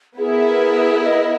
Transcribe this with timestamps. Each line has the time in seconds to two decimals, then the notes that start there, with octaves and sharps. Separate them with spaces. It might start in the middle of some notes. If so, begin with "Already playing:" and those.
0.18 B3 E4 G#4 A#4 E5
1.04 D#5